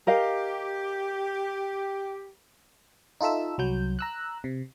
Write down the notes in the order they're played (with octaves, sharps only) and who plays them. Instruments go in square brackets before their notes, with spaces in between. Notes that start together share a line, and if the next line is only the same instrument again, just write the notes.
[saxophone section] G4 [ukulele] A#4 D#5 F5
[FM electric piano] D#4 F4 A4 E5 E6
C2 F#3 G6
A#5 E6 F#6
C3